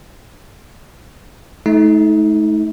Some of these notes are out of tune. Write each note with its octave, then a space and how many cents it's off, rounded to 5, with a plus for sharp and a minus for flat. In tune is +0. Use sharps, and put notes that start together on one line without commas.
A3 -25 D#4 +30